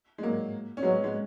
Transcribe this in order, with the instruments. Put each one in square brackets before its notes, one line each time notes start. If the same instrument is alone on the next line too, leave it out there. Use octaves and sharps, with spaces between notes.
[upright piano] G#3
F#3 A#3
C#4
[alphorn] F#3 [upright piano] G#3 B3
[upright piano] G#3